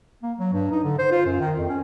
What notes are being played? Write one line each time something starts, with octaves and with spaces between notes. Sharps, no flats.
A#3
F#3
G2
D#4
D3
C5
F4
F#2
D#3
F2
C#4